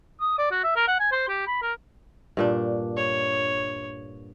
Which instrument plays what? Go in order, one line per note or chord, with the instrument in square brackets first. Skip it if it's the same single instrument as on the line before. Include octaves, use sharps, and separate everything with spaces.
[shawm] D#6
D5
F#4
E5
A#4
F#5
G#5
C5
G4
B5
A#4
[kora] G2 A#2 D4
[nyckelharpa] C#5